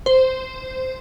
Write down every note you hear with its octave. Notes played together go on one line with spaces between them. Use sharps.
C5